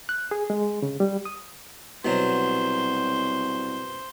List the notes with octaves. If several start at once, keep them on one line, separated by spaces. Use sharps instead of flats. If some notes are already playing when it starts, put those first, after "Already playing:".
F#6
G#4
G#3
C#3
G3
D#6
C2 B2 F#3 C5